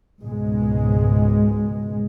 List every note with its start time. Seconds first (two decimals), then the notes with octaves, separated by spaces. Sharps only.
0.21 C#2 G#2 B2 G#3